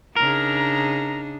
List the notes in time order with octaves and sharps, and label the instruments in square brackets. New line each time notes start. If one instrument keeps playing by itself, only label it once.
[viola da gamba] C#3 D4 D#4 [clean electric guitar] A#4 [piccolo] A#5